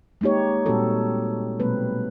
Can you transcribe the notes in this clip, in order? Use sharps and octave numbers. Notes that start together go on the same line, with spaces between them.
G#3 A#3 D#4 G4 C#5
A#2 G3 G#3 C4 F#4 A4
B2 F#3 G#3 A#3 C4 B4